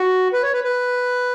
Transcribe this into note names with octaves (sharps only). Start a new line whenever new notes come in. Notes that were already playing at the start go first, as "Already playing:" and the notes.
Already playing: F#4
B4
C#5
B4
B4